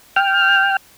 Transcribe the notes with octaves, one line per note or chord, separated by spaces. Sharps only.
G5 F6